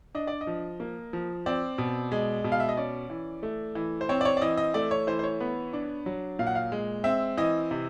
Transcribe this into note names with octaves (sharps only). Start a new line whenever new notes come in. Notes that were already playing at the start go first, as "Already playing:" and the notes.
D4 D#5
D5
D#5
F3
A#3
F3
C4 D5
B2
G#3
B2
F5
E5
D#5
C#4 D5
E3
A3
E3
C5
C4 C#5
D5
C#5
D5
E3 D#5
D#5
A3 D5
C#5
E3 C5
C5
C#5
B3
D4
F#3
A#2 F5
F#5
F5
G#3
C4 E5
E3 D#5
C3